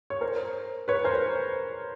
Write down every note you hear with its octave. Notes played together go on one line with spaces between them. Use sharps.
C#5
A#4 C5
B4 C#5
A#4 C5